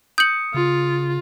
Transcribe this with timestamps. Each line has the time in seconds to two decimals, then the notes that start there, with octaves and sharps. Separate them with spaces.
0.18 D#6 G6 C#7 F#7
0.54 C#3 F4